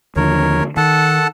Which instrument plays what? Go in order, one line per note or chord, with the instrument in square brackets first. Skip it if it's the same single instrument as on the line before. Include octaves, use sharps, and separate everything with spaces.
[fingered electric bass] D#2 D3 F3 [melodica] A#4 C#5
[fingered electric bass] D#3 [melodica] A4 F#5 A5